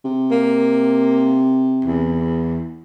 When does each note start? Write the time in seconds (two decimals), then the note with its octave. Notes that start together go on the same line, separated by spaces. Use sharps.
0.04 C3
0.31 A#3
1.85 E2